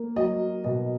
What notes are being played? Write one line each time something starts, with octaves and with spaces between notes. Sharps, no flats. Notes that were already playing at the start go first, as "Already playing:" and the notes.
Already playing: A#3
F#3 D#5
B2 D#5